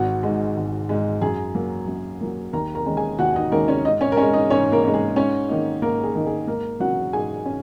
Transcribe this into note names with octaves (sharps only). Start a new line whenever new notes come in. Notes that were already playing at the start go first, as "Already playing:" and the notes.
Already playing: G#1 F#4
G#2 G#3
G#1
G#2 G#3
F#2 G#4
F#3 A#3
F#2
F#3 A#3
D#2 A#4 A#5
A#4 A#5
D#3 G#3 C#4
G#4 G#5
D#2 F#4 F#5
D#4 D#5
D#3 G#3 A#3 C#4 A#4
C#4 C#5
G#2 D#4 D#5
C#4 C#5
A#4
G#3 C#4 C#5
D#4 D#5
G#2 C#4 C#5
A#3 A#4
G#3 C#4
G#4
G#2 C#4 C#5
D#3 A#3 D#4
G#2 A#3 A#4
G#4
D#3 A#3 D#4
G#4
G#2 A#3 A#4
F#3 C#4 F#4 F#5
G#2 G#4 G#5
C#4